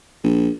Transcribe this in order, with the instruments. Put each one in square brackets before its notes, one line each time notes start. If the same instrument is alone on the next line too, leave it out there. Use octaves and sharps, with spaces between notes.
[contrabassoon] A#1